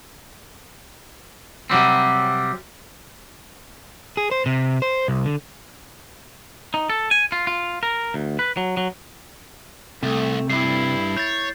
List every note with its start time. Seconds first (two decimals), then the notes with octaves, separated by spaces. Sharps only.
1.70 C3 F#3 G3 C4
4.17 G#4
4.31 C5
4.46 C3
4.82 C5
5.08 C2
5.25 D3
6.74 D#4
6.90 A4
7.11 G#5
7.32 F4
7.47 F4
7.83 A#4
8.14 D2
8.39 B4
8.57 F#3
8.77 F#3
10.03 C2 C3 A3
10.50 G2 E4 C7
11.17 C#5 G6 A6